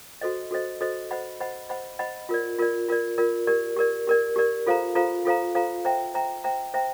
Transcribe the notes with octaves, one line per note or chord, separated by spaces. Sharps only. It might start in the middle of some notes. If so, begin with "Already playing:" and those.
F#4 A4 C5 D#5
F#4 A4 C5 D#5
F#4 A4 C5 D#5
C5 D#5 F#5 B5
C5 D#5 F#5 B5
C5 D#5 F#5 B5
C5 D#5 F#5 B5
F4 A#4 D5
F4 A#4 D5
F4 A#4 D5
F4 A#4 D5
G4 A#4 D5
G4 A#4 D5
G4 A#4 D5
G4 A#4 D5
F4 A4 C5 F5 A#5
F4 A4 C5 F5 A#5
F4 A4 C5 F5 A#5
F4 A4 C5 F5 A#5
C5 E5 G5 A#5
C5 E5 G5 A#5
C5 E5 G5 A#5
C5 E5 G5 A#5